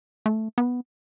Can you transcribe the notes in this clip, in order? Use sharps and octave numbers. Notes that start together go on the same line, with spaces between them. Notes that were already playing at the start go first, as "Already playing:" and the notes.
A3
B3